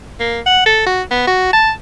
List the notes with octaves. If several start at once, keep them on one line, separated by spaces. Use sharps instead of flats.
A#3
F#5
A4
F#4
B3
F#4
A5